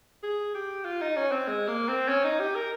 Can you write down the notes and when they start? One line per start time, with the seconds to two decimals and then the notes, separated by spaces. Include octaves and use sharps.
0.23 G#4
0.55 G4
0.85 F4
1.01 D#4
1.16 C#4
1.31 C4
1.47 G#3
1.68 A#3
1.88 C4
2.09 C#4
2.24 D#4
2.39 G4
2.55 A#4